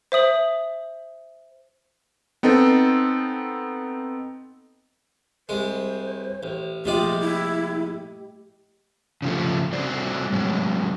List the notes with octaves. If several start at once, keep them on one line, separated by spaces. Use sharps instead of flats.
C5 E5 D#6 F#7
B3 C4 D#4 A4
C2 G#3 C5
A1
A#1 C3 A3 F4 G4 D5 D#5
E4
C#3 F3 A3
G3 A3 F#4 C5 D5
A2 F#3 G#3